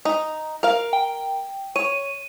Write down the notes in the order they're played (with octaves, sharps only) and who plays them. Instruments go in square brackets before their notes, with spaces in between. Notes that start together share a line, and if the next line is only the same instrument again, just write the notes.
[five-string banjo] D#4
A#4 F5
[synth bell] G5
[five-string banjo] C#5 [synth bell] D#7